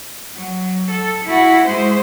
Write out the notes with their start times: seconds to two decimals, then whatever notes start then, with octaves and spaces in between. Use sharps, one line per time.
0.36 F#3
0.90 A4
1.25 E4 F#4
1.66 G#3 C5